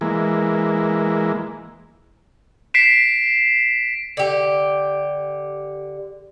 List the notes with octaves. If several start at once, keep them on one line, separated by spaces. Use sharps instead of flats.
E3 G#3 A#3
B6 C7 D7 E7
D3 G4